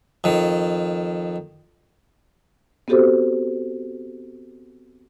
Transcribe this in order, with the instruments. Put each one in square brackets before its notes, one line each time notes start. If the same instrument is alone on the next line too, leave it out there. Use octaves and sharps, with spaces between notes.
[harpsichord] F2 D#3
[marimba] B3 C4 F#4 G4 A4 C5